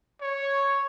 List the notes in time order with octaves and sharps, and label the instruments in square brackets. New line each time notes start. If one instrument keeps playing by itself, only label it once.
[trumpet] C#5